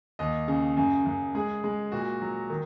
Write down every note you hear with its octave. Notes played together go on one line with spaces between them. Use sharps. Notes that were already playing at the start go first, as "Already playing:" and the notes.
D#2 D#5
C#3
F#2
F#2
G#3 G#4
G#3
A#2 F#4
F#3
D#3